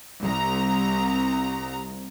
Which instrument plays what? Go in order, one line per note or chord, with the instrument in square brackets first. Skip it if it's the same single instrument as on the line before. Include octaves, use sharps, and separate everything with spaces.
[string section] C2 A#5